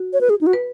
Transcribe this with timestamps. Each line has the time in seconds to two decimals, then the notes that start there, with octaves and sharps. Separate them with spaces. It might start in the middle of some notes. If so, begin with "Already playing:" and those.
Already playing: F#4
0.13 C#5
0.21 B4
0.30 G#4
0.41 D#4
0.47 F#4
0.53 B4